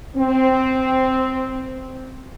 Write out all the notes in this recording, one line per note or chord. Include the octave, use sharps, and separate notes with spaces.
C4